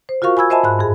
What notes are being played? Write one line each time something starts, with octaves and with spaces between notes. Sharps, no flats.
C5
F4 F#4 A#4 F5 C#6
G#5 B5 E6 G#6
C5 D#5 E5 G#5 A5 B5
G#2 B5 F#6
G2 G#4